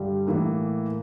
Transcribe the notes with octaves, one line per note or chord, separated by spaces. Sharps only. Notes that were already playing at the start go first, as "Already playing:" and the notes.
Already playing: G2 D3 G3
A2 E3 A#3